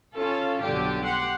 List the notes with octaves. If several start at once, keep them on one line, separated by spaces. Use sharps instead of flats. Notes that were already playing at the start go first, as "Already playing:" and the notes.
C#4 F4 A4 F5
B1 G2 D3 G4
G4 F#5 C6